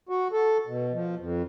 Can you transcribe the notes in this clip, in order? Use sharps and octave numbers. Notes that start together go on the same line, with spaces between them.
F#4
A4
B2
F3
F2